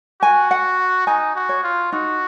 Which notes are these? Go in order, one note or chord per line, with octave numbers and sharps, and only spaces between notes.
F#4 G#5
F#5
D#4 G#5
F#4
C#5
F4
D#4 F#4